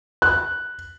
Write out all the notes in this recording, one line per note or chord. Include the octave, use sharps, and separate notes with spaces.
F#6